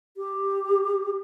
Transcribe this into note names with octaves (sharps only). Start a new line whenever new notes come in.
G4